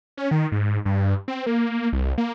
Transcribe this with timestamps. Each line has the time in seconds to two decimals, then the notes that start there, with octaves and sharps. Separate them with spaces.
0.17 C#4
0.31 D#3
0.52 G#2
0.85 G2
1.28 C4
1.46 A#3
1.93 C2
2.18 A#3